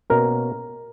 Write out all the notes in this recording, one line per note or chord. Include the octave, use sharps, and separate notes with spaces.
B2 A#3 C#4 A#4